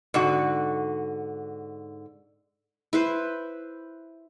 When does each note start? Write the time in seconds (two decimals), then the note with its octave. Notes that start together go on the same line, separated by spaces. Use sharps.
0.14 G#2 D3 F#4
2.93 E4 B4 C5